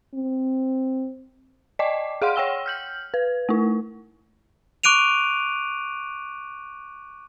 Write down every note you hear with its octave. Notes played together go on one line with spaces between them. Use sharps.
C4
D5 D#5 G5 D6
G#4 F5 F#5 C6 F6
C#5 F#5 G5 E6 G7
F6 G6 F#7
B4
A3 E4
C#6 D6 F#6 D7 D#7 F7